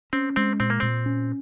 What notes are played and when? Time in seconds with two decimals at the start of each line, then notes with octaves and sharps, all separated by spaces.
0.13 C4 C#4
0.36 G#3 C4
0.60 A#2 C4
0.70 A#3
0.80 A#2 C4
1.06 C#4